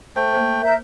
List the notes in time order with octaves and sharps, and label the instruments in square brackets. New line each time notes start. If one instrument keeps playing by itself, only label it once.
[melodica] A3 G5 [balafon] C5
[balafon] A#3 A4 C5
[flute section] A#4 E5 G6